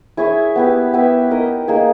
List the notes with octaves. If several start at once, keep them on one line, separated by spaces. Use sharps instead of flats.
E4 G#4 C#5 E5
B3 G4 B4
B3 G4 B4 E5
D#4 A#4 D#5
A#3 D#4 G#4